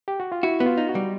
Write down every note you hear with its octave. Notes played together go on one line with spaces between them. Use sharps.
G4
F#4
F4
E4 F#4
B3
F4
D#4
F#4
G3